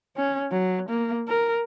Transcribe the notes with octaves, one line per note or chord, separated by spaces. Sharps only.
C#4
F#3
A#3
A#4